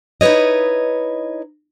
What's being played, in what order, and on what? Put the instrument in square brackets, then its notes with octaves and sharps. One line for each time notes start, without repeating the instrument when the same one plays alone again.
[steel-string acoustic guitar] D#4 E4 B4 C#5 D#5